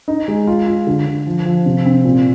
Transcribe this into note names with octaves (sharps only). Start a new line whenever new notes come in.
D#4
G#3
F4
F4
D3
D3
F3
F3
C3
C4
A#2